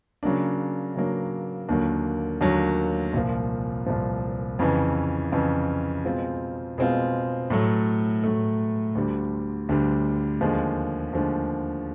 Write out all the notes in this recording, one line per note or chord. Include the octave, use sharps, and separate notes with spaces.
C#3 F#3 A#3 D4
C#3 F#3 A#3 D4
D#2 D3 F#3 A#3
D#2 D3 F#3 A#3
C2 A#2 F3
C2 A#2 F3
F2 C#3 E3
F2 C#3 E3
B2 G#3 C4 F4
B2 G#3 C4 F4
A2 F#3 A3
A2 F#3 A3
D2 D3 G3
D2 D3 G3
D#2 D3 F3 G#3
D#2 D3 F3 G#3